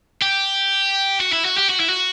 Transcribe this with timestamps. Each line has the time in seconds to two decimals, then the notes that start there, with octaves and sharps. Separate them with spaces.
0.22 G4
1.21 F#4
1.33 E4
1.45 F#4
1.57 G4
1.70 F#4
1.80 E4
1.90 F#4